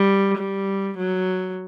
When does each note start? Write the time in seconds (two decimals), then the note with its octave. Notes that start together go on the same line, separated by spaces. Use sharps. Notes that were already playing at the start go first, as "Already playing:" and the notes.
Already playing: G3
0.37 G3
0.98 F#3